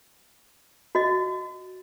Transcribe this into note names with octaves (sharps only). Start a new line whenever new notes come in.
F#4 D#5